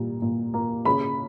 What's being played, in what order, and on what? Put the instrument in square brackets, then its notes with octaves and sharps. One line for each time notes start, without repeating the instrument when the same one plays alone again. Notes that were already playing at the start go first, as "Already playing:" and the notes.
Already playing: [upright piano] A#2 G3
A#2
A#3
C#3 B5